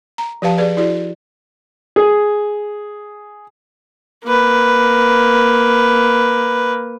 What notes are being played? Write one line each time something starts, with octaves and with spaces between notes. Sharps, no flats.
A#5
F3 G4 B4 F5 A5
G#4 B4 D5
E4 F#4 G#4 D5
G#4
A#3 B4